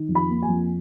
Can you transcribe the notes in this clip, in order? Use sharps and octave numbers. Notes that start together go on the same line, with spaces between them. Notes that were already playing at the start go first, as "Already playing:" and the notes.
Already playing: D#3
F2
B5
A#3
G#5
F2